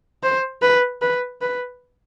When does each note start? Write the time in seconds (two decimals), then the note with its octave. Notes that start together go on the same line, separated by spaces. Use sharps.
0.23 C5
0.62 B4
1.02 B4
1.41 B4